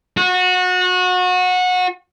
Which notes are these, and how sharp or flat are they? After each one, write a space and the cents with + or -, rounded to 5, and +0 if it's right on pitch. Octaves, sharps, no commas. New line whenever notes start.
F#4 -25